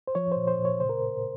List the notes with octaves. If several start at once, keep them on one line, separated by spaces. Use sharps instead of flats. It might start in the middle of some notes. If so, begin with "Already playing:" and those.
C5
F3 C#5
C5
A#2
C5
A#2
C#5
C#3 C5
A#4